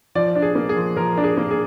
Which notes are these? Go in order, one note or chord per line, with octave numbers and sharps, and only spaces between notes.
F3 D5
D4
G#4
A#3
G#4
F3
F3 A#4
D4
G#4
A#3
G#4